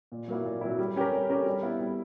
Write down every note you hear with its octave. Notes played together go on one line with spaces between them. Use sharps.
A#2
F#3 A#3 E4
A#2
F#3 A#3 E4
G3
C#4 G4 A#4
G3
C#4 G4 A#4
G3
B3 E4
G3